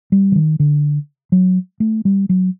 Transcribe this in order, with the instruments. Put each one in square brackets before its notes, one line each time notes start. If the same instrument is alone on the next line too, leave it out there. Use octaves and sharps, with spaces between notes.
[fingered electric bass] G3
E3
D#3
D3
F#3
A3
G3
F#3